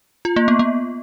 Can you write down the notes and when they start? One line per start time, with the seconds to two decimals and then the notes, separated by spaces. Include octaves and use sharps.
0.25 F4
0.36 A#3
0.48 B3
0.59 B3